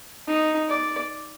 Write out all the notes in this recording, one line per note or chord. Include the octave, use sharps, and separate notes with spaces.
D#4
D5